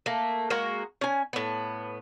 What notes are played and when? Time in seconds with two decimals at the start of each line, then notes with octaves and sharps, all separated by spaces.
0.06 A3 A#3
0.50 G#3 A#3 F#4 A#4
1.01 C#4 G#5
1.33 A2 B3